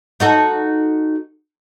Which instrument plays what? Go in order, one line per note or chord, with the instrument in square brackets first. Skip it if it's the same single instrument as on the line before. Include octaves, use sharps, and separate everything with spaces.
[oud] D#4 F#4 A4